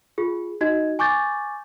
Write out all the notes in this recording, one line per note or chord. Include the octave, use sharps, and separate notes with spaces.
F4 G#4
D#4 F#4 D#5 G#6
G#5 C#6 D6 G6 A6